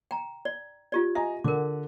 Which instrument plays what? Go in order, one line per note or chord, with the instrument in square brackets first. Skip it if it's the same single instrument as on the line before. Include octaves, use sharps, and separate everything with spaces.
[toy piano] G5 A#5
D5
F4 G4 D5
[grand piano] D#5 G#5 A#5 [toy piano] E5
[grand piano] D3 F#5 [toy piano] A#4 D6